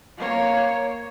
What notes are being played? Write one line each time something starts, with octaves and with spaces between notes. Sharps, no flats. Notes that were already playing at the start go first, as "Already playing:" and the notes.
A#3 C#5